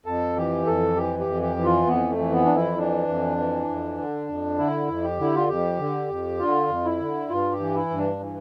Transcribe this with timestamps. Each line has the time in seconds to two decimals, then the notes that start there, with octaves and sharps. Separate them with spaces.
0.06 F2 A4
0.36 E3 G4
0.67 F2 A4
0.96 E3 G4
1.19 G4
1.26 F2
1.42 G4
1.57 E3
1.65 F4
1.87 F2 B3
2.09 A3
2.18 E3
2.32 B3
2.46 F2 D4
2.55 E4
2.78 E3 D4
3.08 F2
3.38 E3
3.68 F2
3.97 D3
4.28 F2
4.58 D3 E4
4.88 F2
5.04 G4
5.19 D3 E4
5.35 F4
5.48 F2 G4
5.79 D3
6.09 F2
6.39 D3 F4
6.69 F2
6.85 E4
7.00 D3
7.29 G2 F4
7.52 G4
7.60 E3
7.75 E4
7.90 G2
7.98 D4
8.20 E3